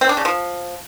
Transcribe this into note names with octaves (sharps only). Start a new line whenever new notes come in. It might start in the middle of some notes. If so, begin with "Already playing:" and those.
C4
D4
C#3
F3